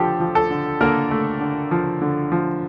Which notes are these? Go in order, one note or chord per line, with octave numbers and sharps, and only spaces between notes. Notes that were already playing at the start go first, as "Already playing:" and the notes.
Already playing: D3 F3 G4 A4
F3
A4
D3
D3 A#3 A#4
A3
D3
F3
D3
F3